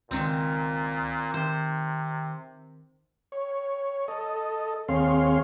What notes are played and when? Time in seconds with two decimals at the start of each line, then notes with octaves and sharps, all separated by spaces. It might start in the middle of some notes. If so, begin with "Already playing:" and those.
0.11 C#2 A#2 D#3 C4
1.34 C3 D#3 C5
3.32 C#5
4.08 A4 D#5
4.89 D#2 C4 G#4 C#5 F5 C6